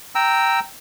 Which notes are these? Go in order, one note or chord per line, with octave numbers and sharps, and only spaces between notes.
G5 A#5 E6